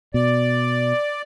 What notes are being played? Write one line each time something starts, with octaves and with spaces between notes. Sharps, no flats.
B2 D5